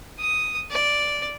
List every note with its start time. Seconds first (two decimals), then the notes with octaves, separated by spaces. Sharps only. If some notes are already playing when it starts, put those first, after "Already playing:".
0.20 D#6
0.70 D5